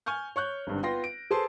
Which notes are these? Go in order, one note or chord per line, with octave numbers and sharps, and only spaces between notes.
G#5 C#6 F6 G6
C#5 C#6 F#6 G6
G#1 G2 D3
B3 F4 G5 C6 A#6
D7
G#4 A4 B4 C5 A5 C6